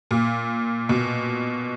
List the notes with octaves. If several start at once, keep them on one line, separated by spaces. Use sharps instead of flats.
A#2
B2